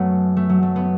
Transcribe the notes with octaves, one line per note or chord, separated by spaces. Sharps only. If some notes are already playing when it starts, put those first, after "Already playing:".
Already playing: F#2 F#3 A3 B3
A3
F#3
A3
B3